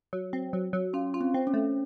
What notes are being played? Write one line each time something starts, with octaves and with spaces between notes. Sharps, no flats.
F#3
C4
F#3
F#3
C#4 F4
F4
C4
C4
C#4
A3